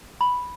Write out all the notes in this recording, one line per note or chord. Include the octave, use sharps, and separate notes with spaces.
B5